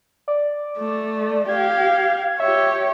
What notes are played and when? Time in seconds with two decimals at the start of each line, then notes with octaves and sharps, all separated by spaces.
0.28 D5
0.78 A3
1.49 G4 F5 G#6
2.40 G4 C#5 E5